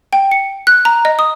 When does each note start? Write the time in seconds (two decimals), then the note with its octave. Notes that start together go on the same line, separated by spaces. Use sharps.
0.13 G5
0.31 C#7
0.67 F#6
0.85 A#5
1.05 D#5
1.19 D#6